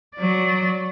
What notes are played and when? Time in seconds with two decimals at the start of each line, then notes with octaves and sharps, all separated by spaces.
0.16 F#3 D5